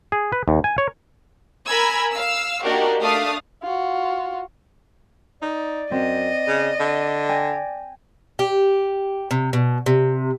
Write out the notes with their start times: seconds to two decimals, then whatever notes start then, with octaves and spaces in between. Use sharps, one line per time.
0.12 G#4
0.32 B4
0.48 D#2
0.64 G#5
0.78 C#5
1.68 A#4 G#5 A#5 B5 E6 G#6
2.11 F5 E6
2.63 A#3 D4 D#4 F#4 G4 A#4
3.00 A3 D4 F5 D#6
3.62 F4 F#4
5.42 D#4 D5
5.91 F#2 C4 D#5
6.48 C#3
6.80 D3
7.29 G5 G#5 A#6
8.39 G4
9.31 C3
9.53 B2
9.86 C3